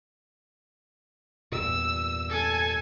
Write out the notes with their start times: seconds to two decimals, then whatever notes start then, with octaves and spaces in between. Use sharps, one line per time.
1.52 E2 G2 A#2 E6
2.29 A4 G#5